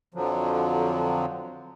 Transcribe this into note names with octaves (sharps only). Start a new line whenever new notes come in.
F2 D3 F3 F#3